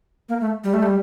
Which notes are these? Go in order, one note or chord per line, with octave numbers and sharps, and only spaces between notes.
A#3
A3
G3
A3
G3